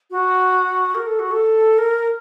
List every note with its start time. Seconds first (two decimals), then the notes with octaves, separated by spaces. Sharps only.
0.11 F#4
0.95 A#4
1.06 A4
1.19 F#4
1.31 A4
1.78 A#4